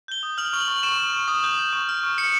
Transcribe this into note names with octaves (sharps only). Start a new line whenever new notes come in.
G6 G7
D#6
F6 F#7
C#6 F#7
C#6 F#7
C#6 E7
C#6
C#6
D#6
G6
D#6
C#6
F6
C#6
F6 C#7